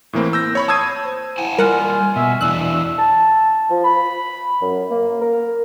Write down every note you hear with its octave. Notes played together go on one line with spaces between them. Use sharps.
A2 E3 A#3 C4
E6 G6 A#6
C#5 B5 C#6
A5 D#6 E6 G#6 C7 D#7
C5
E4 F#5 G#5 A5
G3 A#3 F4 A#4 F#5 G#5
B2 E5
E2 D4 E4 E6 F#6
A5
F3
B5
F#2
A#3
A#4